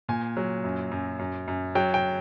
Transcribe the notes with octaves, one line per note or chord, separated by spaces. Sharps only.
A#2 G#5
F#3
F#2
F#2
F#2
F#2
F#3 G5
G5